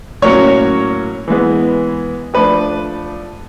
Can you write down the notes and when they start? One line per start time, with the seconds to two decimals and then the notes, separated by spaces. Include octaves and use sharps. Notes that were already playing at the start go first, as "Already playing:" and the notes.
0.22 A2 F#3 A#3 C#4 C#5
1.28 E3 G#3 B3
2.34 F3 A3 D4 B4